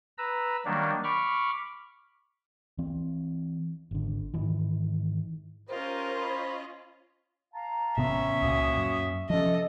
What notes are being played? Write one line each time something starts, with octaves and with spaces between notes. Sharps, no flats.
B4 A#5 E6
D#3 F#3 G3 A#3 D4
B5 C#6 D6 F6
E3 C4
G#1 D3
G#2 D#3 E3
C#4 F4 G4 A#4 C5 D#5
C#5 B5
F5 A5 A#5
A1 C3 B3 C#4 E5
C#2 A#2 C#3 A#3 F#4 D#6
F#2
C3 F3 C#4 A4 D#5